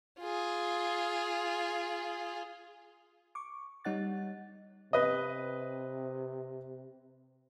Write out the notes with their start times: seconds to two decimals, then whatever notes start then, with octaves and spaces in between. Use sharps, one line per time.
0.20 F4 G#4
3.35 C#6 D6
3.85 G3 D#4 C#5 F#5 F#6 A6
4.93 C3 B4 D#5